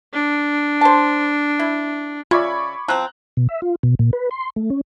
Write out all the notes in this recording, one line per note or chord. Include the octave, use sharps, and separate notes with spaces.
D4
C5 A5
E4
C#3 F4 D5 E5 B5 C#6 D6 G#6
F3 C4 A#5 F#6
B2
E5
F4
B2
A#2
B4
C6
A3
C#4